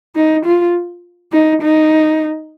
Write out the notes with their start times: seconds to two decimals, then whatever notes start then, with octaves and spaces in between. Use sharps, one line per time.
0.16 D#4
0.45 F4
1.32 D#4
1.62 D#4